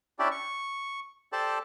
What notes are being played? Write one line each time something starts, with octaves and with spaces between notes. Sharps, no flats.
C#4 D4 E4 G4 D5
C#6
G4 A4 C5 D5 A5